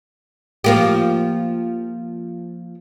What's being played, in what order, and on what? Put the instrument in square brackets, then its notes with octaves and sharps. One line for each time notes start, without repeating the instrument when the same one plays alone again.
[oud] F3 A#3 G4